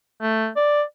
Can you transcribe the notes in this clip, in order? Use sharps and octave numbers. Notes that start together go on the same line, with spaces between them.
A3
D5